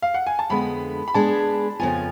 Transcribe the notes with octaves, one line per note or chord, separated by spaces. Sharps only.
F5
F#5
G#5
A5
F2 D3 G#3 B3 B5
B5
G#3 B3 D4 G#4 A5
F2 C#3 F3 B3 F4 G#5